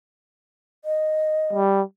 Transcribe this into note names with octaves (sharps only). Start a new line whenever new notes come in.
D#5
G3